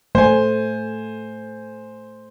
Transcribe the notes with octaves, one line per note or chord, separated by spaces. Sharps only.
A3 C5 G#5